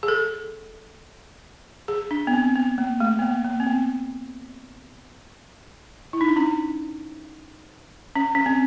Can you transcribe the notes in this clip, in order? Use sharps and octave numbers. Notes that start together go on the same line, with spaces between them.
G#4
A4
G#4
D4
B3
C4
B3
A#3
A3
B3
A#3
A#3
C4
B3
E4
D#4
D4
C#4
C#4
C#4
C4